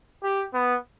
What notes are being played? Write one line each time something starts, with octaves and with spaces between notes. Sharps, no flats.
G4
B3